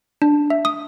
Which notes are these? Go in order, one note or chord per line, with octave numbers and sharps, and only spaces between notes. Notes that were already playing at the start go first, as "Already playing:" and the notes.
D4
E5
D#6